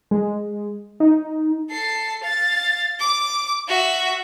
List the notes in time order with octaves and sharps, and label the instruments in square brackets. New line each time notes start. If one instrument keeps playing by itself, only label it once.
[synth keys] G#3
D#4
[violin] A4 C7
F5 A6
D6
F#4 E5